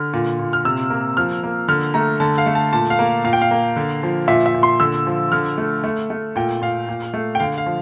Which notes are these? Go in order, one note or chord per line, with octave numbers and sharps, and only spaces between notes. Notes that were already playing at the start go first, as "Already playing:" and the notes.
Already playing: D3 F6
A#2
A#2
F6
C3 E6
A#3
F3 F6
A#3
D3 F6
A3 A#5
D3 A5
F5
A3
A5
A#2 A5
F5
A#3
A#2 F5
G5
F5
A#3
D3
F3
A#2 E5
E5
A#2
C6
D3 E6
F3
D3 F6
A3
A3
A3
A#2 G5
A#2 F5
A#2
A3
G5
D3 F5
F5
F3